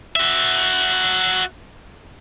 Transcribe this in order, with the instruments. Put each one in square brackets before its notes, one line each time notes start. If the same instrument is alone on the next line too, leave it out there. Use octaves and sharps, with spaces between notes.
[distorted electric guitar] F#4 E5